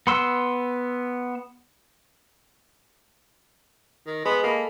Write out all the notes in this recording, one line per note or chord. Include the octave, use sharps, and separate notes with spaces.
B3 C6 E6
D#3
G#3 B3
A#3 A4 B5